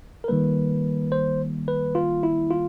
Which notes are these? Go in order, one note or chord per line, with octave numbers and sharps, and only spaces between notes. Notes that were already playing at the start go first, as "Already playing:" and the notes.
A#4
D#3 G3 A#3 B4
C5
B4
F4
E4
F4